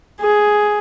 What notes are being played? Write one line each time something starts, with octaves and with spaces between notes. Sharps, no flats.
G#4